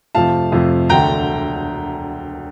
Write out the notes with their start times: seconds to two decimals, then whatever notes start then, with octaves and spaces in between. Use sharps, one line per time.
0.15 F2 C3 F3 A3 F5 A5
0.52 F2 C3 F3 A3
0.89 E1 D2 D3 A3 G5 A#5